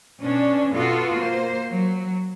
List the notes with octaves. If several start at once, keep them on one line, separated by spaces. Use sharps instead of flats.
B2 C#4 D4
B2 B3 F4 F#4 A4
A#3 C5
F#3